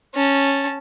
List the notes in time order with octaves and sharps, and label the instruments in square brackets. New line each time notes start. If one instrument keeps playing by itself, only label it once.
[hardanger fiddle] C#4 A5